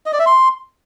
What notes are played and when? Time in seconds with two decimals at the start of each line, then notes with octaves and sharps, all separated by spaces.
0.06 D#5
0.13 D5
0.19 E5
0.26 C6